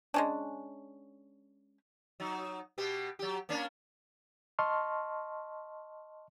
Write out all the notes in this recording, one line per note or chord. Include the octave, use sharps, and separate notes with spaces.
G#3 C#4 D4
F#3 D#4
B2 B3 G4
F#3 G4
A#3 C#4 D4
D#5 A5 C6 C#6 F6